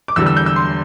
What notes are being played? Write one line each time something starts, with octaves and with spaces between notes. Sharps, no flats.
D6
E2 D3 G3 E6
E6
G6
E6
C6